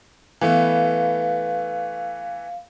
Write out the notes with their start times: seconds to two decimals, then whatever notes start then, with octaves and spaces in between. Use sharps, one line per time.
0.41 E3 A3 B3 F5